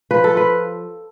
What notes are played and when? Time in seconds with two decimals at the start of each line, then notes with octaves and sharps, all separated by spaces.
0.11 F3 B4
0.24 A4
0.34 F4 B4